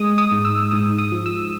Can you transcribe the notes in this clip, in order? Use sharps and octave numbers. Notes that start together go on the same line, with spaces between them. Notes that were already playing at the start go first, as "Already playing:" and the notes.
Already playing: G#3 D#6
D#6
G#2
E6
G#2 D#6
D#6
F3
E6